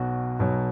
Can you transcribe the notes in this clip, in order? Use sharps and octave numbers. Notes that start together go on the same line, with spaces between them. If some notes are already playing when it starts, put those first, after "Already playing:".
Already playing: B1 B2 F#3 F#4
B1 B2 F#3